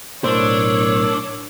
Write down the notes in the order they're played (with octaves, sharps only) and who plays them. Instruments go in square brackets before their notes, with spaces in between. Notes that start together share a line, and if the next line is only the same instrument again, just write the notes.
[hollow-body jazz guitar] B1 A2 C5 [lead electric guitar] D4 [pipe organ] A#4 D6 E6 [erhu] C#5